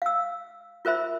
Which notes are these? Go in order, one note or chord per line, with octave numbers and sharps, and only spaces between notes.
F5 E6
F4 A#4 C5 E5 B5